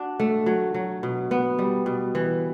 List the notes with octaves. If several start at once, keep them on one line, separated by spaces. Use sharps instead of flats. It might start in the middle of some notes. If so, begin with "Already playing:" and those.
Already playing: D4 F#4
A3
F#3
F#3
B2
B3
G3
B2
E3